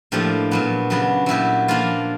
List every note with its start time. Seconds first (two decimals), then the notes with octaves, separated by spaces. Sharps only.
0.12 A2 F3 A#3 D4 G4
0.51 A#2 F#3 B3
0.90 C#3 F#3 B3 D4
1.26 A#2 F#3 B3 E4 G4
1.68 F3 A#3 D4 F4